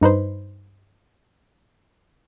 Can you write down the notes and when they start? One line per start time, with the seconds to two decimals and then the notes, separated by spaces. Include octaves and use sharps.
0.01 G2 D#4 B4 C5